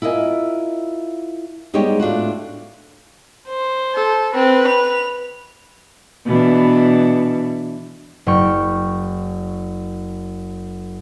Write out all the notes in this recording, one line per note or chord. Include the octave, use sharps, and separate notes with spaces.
E4 F4 A#4 D#5 G#5
G3 G#3 B3 D#4 G4 C#5
A2 D4 F4 F#4
C5
A4
C4 B4
F7
B2 E3 D4
F#1 G5 C#6